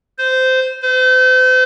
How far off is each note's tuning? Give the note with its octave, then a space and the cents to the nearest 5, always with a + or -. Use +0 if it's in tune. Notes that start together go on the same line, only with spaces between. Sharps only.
C5 -15
C5 -40